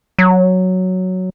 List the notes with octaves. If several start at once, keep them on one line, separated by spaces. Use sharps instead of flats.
F#3